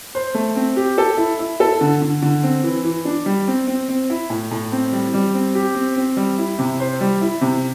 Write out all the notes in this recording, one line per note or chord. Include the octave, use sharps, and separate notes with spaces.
C5
A3
C4
G4
A4
E4
E4
A4
D3
D3
D3
C4
E3
E3
D4
G3
C4
C4
C4
E4
A2
A2
C4
G3
G3
C4
G4
C4
C4
G3
E4
C3
C5
G3
E4
C3